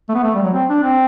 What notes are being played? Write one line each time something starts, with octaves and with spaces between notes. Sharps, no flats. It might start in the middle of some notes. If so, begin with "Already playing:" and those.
A3
B3
A3
G3
F#3
C4
D4
C4